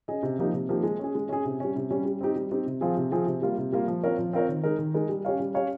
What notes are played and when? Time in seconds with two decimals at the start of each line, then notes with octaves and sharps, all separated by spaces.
0.08 C#4 G#4 D#5
0.23 C3
0.39 F3 A#3 D#4 G4
0.53 C3
0.69 F3 A#3 D#4 G4
0.84 G#3
0.99 C#4 G#4
1.15 G#3
1.29 C#4 G#4
1.45 C3
1.60 G3 C#4
1.76 C3
1.90 G3 C#4
2.05 G3
2.21 C4 D#4 G4
2.36 G3
2.51 C4 D#4 G4
2.66 C3
2.81 F3 C4 F4 G#4
2.97 C3
3.12 F3 C4 F4 G#4
3.27 C3
3.42 G3 A#3 F4
3.58 C3
3.72 G3 A#3 F4
3.88 F3
4.04 C4 F4 A#4 C#5
4.18 F3
4.33 C4 F4 A#4 C#5
4.49 D#3
4.64 G#3 D#4 A#4
4.79 D#3
4.94 G#3 D#4 A#4
5.09 G3
5.25 C#4 G4 C#5 F5
5.40 G3
5.54 C#4 G4 C#5 F5